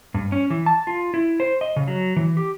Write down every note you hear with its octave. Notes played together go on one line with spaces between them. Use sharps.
G2
C#4
E3
A5
F4
E4
C5
D#5
C#3
F#3
E3
G4